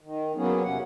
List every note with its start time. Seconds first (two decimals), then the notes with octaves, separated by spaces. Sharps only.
0.01 D#3
0.36 F#3 A#3 B3 C#4 G#4
0.64 E2 C3 C#4 F#5